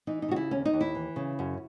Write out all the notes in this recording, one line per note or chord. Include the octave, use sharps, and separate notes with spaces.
E3 D#4
D#4
C#3 F#4
E4
D#2 C#4
D#4
D#2
E4
E3
C#3
F#2